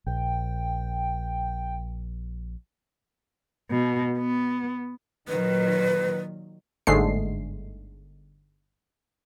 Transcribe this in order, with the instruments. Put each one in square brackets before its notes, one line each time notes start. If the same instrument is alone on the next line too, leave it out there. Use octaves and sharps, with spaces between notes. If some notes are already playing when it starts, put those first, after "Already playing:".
[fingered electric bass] A#1 [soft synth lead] G5
[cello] B2
B3
[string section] A#2 D#3 F#3 [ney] B4
[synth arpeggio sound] G1 G#2 D3 G#3 A3 C7